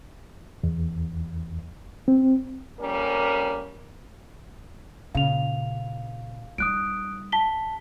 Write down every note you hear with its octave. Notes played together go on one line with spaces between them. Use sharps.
E2
C4
F2 G3 A#3 C#4 A#4
A#2 C#3 F5 F7
G3 D#4 D#6 F#6 D7
A5 B6 G7